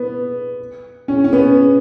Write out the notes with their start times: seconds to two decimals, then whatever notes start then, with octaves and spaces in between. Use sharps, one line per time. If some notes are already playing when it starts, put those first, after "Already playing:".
Already playing: B3
1.08 C#4
1.24 C#4
1.33 B3